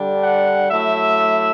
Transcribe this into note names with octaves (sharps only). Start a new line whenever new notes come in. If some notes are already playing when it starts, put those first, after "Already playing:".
Already playing: D3 G3 D4
F#5
F#3 A3 E4 E5